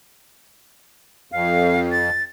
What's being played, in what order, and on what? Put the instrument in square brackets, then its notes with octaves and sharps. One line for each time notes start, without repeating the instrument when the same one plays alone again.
[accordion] F2 [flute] F5
[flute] A6